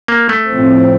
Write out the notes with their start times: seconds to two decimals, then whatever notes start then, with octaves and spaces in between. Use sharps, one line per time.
0.08 A#3
0.29 A3
0.49 A2 F3 C4